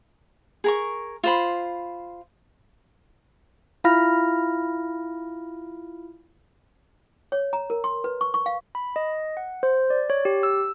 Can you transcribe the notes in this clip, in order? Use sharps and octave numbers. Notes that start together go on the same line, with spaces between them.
G#4 A#4 C#6
F4 C5 B5
E4 F4 F5 B5 F6 A#6
C#5
A#5
A#4
C6
B4
C#6
C#6
F5
B5
D#5
F#5
C5
D5
C#5
G4
E6